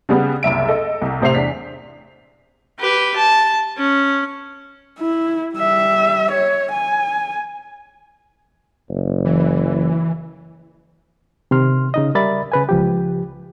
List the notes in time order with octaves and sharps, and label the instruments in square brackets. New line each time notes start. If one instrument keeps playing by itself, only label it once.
[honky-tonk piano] C#3 G3 B3
F#1 C2 E5 D7
A4 D#5
C2
A2 C3 C5 E5 C7 F7
E2 D4 B6
[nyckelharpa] G4 B4
A5
C#4
[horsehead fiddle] E4
G3 E5
C#5
G#5
[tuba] F#1
[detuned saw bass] E3
[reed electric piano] C3 D#3 C6 F6
C#3 D#4 D#5
G3 A#4 D5 E5 B5 A6
C#3 B4 G#5
C#2 F3 G4